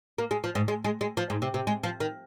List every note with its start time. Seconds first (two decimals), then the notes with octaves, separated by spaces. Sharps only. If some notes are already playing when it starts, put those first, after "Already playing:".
0.18 A#3
0.31 G#3
0.44 F3
0.55 G#2
0.68 G#3
0.84 G#3
1.01 G#3
1.17 F3
1.30 G#2
1.42 C3
1.54 C3
1.67 G#3
1.83 F3
2.00 D#3